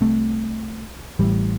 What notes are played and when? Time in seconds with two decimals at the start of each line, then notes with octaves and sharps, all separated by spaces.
0.01 C2 C3 A3
1.19 A1 A2 G3